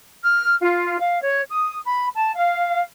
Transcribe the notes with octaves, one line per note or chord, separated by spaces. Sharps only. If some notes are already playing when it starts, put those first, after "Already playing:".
F6
F4
F5
C#5
D#6
B5
A5
F5